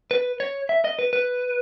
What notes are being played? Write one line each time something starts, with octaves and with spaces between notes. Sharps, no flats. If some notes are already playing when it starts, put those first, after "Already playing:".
B4
C#5
E5
D#5
B4
B4